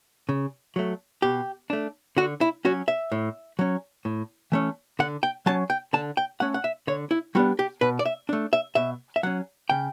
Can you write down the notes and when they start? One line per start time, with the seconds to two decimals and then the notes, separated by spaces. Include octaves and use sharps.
0.29 C#3
0.76 F#3 A3
1.22 B2 G4
1.70 A3 D4
2.17 D3 F#4
2.41 E4
2.65 F#3 C#4 F#4
2.88 E5
3.12 A2
3.59 F#3 C#4
4.05 A2
4.52 E3 A3 C#4
4.99 D3 F#5
5.23 G5
5.46 F#3 C#4 A5
5.70 G5
5.93 D3 A5
6.17 G5
6.40 A3 C#4 F#5
6.54 F#5
6.64 E5
6.87 D3 C#5
7.11 E4
7.35 G3 B3 D4 F#4
7.59 G4
7.81 B2 B4
7.99 D5
8.05 E5
8.29 A3 D4
8.53 E5
8.75 B2 E5
9.16 E5
9.23 F#3 C#4 F#5
9.70 C#3 G5